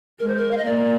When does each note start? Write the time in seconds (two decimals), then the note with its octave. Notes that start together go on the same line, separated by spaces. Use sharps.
0.20 G#3 A#4
0.28 C5
0.37 A#4
0.51 F5
0.57 D#5
0.65 A#3 D5